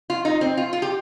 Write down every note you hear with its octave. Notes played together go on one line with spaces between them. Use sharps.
F4
D#4
C4
F4
F4
G4